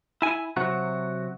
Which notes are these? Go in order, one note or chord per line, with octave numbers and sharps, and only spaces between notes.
E4 G#5
C3 F#3 F#4